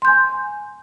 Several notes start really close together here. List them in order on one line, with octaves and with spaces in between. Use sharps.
C6 G6 G#5